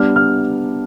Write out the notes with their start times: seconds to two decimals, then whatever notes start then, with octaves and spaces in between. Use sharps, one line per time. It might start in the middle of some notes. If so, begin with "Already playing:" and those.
Already playing: G3 B3 D4 F6
0.16 F6